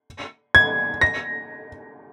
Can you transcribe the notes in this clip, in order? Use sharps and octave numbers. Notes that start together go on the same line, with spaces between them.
G#6
A#6